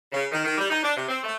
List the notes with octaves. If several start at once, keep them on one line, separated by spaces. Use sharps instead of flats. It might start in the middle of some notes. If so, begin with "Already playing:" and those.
C#3
D#3
D#3
G3
D#4
D4
C3
C4
A3